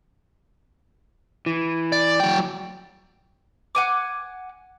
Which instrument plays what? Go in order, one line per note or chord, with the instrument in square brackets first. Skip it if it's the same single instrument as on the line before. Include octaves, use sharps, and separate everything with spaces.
[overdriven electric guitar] E3
[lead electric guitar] D5
F#3 G5
[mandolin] F#5 G#5 D6